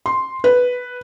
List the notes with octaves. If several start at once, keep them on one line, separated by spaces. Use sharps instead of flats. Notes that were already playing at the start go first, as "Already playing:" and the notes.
C6
B4